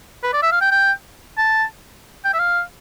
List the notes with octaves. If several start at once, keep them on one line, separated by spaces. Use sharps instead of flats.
B4
D5
E5
F5
G5
G5
A5
G5
E5
F5